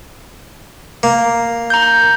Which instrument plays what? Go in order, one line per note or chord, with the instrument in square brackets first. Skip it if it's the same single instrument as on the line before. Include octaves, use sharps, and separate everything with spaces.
[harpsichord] A#3
[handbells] A#5 G6